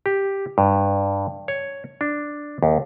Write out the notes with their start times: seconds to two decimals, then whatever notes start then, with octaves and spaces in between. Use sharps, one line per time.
0.06 G4
0.58 G2
1.48 C#5
2.01 D4
2.63 D#2